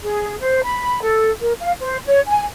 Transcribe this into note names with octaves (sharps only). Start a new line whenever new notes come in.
G#4
C5
B5
A4
A#4
F5
C5
C#5
G#5